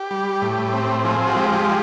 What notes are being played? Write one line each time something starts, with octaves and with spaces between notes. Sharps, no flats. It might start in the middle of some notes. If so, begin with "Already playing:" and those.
Already playing: G4
G3
A2
C4
F3 G#4
F#4
G#3 G4